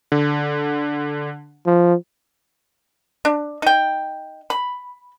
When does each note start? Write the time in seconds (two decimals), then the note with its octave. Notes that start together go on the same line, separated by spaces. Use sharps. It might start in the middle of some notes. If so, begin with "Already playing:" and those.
0.12 D3
1.66 F3
3.25 D4
3.62 D#4 G5
4.50 B5